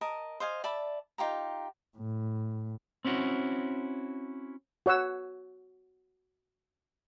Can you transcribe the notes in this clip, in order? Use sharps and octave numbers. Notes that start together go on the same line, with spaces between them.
A#4 D#5 A5
C5 D#5 F5 G#5
D5 E5 A5 B5
D#4 F4 G4 A#5
A2
C4 C#4 E4 F#4
F#4 C#5 F#5 E6